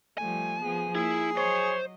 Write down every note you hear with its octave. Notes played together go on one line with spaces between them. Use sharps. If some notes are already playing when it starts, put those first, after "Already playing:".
F3 G3 A3 G#5
F3 B3 G#4
A#3 E4 G#4
F#3 C5 C#5 D#5